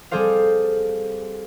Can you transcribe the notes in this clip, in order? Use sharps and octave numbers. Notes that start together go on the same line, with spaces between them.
G3 C4 G#4 A4 C5 F5